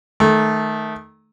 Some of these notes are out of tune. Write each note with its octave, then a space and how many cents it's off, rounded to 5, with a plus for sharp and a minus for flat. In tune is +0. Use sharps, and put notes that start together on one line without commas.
D#3 +0 A3 -15